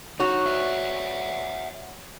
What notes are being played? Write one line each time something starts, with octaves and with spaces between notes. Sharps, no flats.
D#4 F#4 C#5
D5 E5 F#5